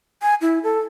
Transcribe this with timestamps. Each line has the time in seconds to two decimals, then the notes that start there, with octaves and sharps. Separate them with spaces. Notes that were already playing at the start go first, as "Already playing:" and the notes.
0.22 G#5
0.41 E4
0.63 A4